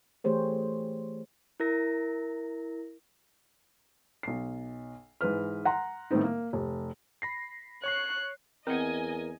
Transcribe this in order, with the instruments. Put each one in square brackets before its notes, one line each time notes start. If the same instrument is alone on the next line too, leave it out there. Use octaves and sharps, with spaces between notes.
[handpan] E3 A3 G4 G#4 C5 C#5
[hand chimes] E4 A#4 A#6
[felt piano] B1 C7
G#2 E3 B4 F6
F#5 A#5 C6
A2 D#3 B3 C4 D#4
A#3
F1
[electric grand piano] B5 A#6 C7
[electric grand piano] C#5 C#6 C7 [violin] F#6
[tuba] E2 [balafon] C4 F#5 [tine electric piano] A#4 [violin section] D#5 G#5